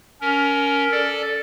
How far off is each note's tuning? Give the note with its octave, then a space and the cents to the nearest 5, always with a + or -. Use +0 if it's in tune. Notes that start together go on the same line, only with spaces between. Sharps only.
C#4 +25 A#4 +0
A4 +0 D5 +0